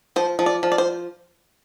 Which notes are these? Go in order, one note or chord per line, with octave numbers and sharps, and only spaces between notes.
F3 C5
F3
D5
F3
D5
C5